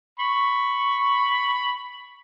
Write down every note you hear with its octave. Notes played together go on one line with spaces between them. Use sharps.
B5 C#6